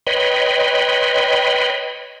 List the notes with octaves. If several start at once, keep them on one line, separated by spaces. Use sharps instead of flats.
B4 C#5 D#5 G5 B5 C6